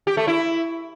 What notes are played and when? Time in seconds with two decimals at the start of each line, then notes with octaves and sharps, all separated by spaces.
0.07 G4
0.17 A3
0.27 E4